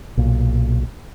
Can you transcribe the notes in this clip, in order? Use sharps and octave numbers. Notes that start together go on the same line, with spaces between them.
B1 A#2